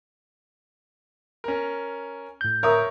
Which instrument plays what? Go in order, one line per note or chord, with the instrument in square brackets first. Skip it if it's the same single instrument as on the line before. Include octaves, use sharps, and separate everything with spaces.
[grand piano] C#4 A#4
[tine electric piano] A2 G6
[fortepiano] A#4 E5 D#6 [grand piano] C#5